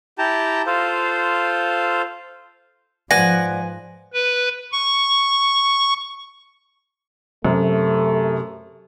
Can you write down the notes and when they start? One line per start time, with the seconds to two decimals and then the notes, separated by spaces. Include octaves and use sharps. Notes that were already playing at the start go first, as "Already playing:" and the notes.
0.18 E4 G4 G5 A5 A#5
0.67 F4 A4 C5 F5
3.11 G#2 F3 B4 D5 F#5 G#5 A#6
4.14 B4
4.72 C#6
7.45 F#2 C3 A3